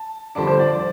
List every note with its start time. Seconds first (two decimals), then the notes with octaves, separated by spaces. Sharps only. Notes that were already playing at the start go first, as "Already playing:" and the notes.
Already playing: A5
0.35 F2 D3 G3 D4 A5
0.47 C5
0.59 D5